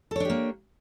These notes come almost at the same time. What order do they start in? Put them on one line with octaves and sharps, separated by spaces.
A4 C#5 D4 G4 A#3